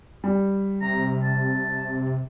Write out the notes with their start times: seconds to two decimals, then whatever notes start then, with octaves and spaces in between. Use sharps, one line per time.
0.24 G3
0.81 C3 A#5
1.23 A5